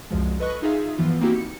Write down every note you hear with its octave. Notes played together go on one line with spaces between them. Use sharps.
C2 F#2 F3 G#3
A4 B4 D#5 C#6 F#6
D#4 F4 G#4 E5 F5
G2 E3 F3 B3 F4
A#3 C4 D#4 E4 F#4 G4
C#7